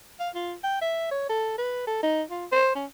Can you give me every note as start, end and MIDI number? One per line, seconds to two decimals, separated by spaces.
0.20 0.29 77
0.35 0.54 65
0.64 0.81 79
0.82 1.08 76
1.11 1.29 73
1.29 1.54 69
1.58 1.86 71
1.87 2.00 69
2.03 2.22 63
2.31 2.46 65
2.52 2.74 72
2.75 2.86 61